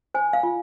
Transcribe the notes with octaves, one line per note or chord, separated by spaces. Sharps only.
C5 G#5
F5
F4